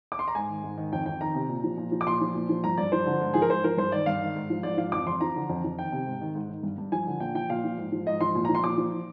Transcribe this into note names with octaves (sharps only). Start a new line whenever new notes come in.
D6
C6
A#5
G#2 G#5
D#3
G#2
D#3
F2 G5
F2 G5
D#3 A#5
C3
A#2
F3
A#2
F3
D6
A#2 C6
F3
A#2
F3
G2 A#5
G2 D5
F3 C5
D3
G#2
F3 G#4
A#4
G#2 C5
F3 A#4
G2 C5
D#3 D5
G2 F5
D#3
G#2
F3
G#2 D5
F3 F5
F2 D6
F2 C6
F3 A#5
D3
F2
F2
D#3 G5
C3
G#2
D#3
G#2
D#3
G2
G2
F3 G#5
D3
A#2 G5
F3 G5
A#2 F5
F3
G#2
F3
G#2 D#5
F3 C6
A#2
A#5
F3
C6
A#2 D6
F3